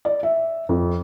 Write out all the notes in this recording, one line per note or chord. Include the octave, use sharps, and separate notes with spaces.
D5
E5
F2